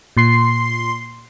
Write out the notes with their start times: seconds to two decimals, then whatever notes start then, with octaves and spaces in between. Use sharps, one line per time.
0.17 A#2 C6 C7